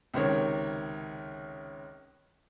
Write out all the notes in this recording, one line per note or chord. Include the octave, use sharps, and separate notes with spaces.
C#2 C3 D#3 C#5